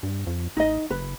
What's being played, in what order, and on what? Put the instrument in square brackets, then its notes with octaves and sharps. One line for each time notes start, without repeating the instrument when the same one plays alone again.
[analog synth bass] G2
F2
[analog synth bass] A1 [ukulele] D#4 D#5
[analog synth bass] F#1 [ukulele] B4